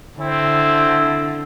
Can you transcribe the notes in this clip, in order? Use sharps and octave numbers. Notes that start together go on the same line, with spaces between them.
D3 C4 E4